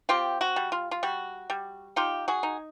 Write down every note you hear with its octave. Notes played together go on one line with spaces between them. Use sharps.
C4 F4 G4
F#4
G3
F4
F4
G3 F#4
G3
D#4 F4 G4
F#4 G#4
D#4